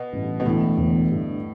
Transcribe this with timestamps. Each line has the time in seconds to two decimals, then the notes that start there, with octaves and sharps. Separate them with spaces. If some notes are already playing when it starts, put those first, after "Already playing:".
Already playing: B2
0.13 A1 G2 E3 A3
0.40 B2
0.45 E1 E2 A2 D3
0.77 E1 E2 D3
1.10 G2 D3 A3